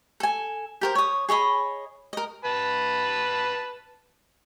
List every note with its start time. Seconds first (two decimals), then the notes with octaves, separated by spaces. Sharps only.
0.20 A4 G#5
0.81 G4 A#4 C5
0.95 C#5 D#6
1.29 G#4 C#5 D#5 B5
2.13 A#4 D#5
2.45 B4 A5 B5